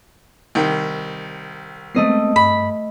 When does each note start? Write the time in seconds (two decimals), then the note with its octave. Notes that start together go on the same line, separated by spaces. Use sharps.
0.55 C2 D#3
1.95 G#3 A3 B3 C4 D#5 C7
2.36 G2 B5